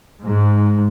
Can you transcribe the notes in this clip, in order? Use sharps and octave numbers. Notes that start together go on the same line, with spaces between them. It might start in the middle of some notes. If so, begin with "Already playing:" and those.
G#2